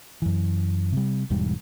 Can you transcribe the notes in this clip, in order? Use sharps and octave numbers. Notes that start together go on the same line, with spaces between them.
F#2 E3
C3 G3
E1 E2 G#2 G3